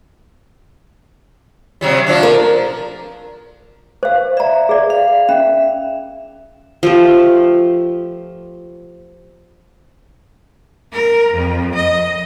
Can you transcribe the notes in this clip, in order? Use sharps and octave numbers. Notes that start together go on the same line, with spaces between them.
C3 F#3 G3
F3 D4
A#4
C5 F5
D5 E5 A#5
G#4 D5
F5
C#4 E5
F3 A3 G4
A#4
F2
D#5